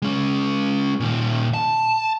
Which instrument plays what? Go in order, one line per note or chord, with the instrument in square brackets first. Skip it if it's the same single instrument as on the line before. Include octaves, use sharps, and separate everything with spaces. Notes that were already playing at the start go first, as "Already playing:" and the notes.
[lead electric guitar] G#3 C#4
A#2 D#3
A5